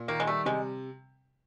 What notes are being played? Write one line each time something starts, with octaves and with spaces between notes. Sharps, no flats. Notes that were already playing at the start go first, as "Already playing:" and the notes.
Already playing: A#2
D#3 A#3
G#3
G3 A3
C3 G#3